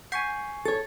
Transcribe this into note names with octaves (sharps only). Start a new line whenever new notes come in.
F#5 G#5 C#6 G6 B6 C7
A4 C#5 A6